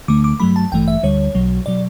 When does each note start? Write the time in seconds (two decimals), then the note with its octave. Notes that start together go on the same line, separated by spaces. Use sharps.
0.08 D2 D3 A3 D6
0.24 D6
0.40 G2 F#3 A3 B5
0.56 A5
0.72 A1 G2 E3 A3 G5
0.88 E5
1.03 D2 D3 G3 C#5
1.35 B1 B2 F#3
1.66 B2 F#3 D5